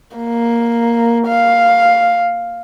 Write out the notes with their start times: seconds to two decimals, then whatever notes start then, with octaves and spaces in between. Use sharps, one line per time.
0.16 A#3
1.27 F5